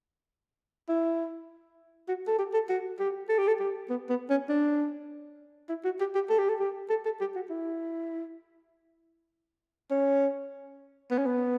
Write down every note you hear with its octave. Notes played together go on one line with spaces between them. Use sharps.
E4
F#4
A4
G4
A4
F#4
G4
A4
G4
A4
G4
B3
B3
C#4
D4
E4
F#4
G4
G4
A4
G4
A4
G4
A4
A4
G4
F#4
E4
C#4
B3
C#4
B3